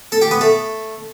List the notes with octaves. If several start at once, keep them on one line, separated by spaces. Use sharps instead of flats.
A4 A5
G4 G5
B3 B4
A3 A4